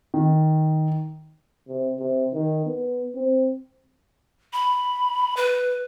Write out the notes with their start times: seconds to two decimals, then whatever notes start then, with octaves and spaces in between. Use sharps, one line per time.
0.14 D#3
1.68 C3
1.99 C3
2.33 D#3
2.66 B3
3.15 C4
4.53 B5
5.37 B4